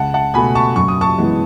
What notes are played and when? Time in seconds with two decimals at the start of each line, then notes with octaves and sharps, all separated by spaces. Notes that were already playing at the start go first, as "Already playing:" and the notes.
Already playing: C#2 F#5 A5
0.14 F#5 A5
0.34 B2 A3 G#5 B5
0.55 A5 C#6
0.76 F#2 C#6
0.88 D#6
1.01 A5 C#6
1.18 E3 G#3 B3